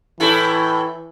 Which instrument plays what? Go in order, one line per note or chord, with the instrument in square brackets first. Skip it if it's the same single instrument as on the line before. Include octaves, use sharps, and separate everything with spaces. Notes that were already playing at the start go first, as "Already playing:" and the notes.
[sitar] A2 E4 A4 [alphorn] E3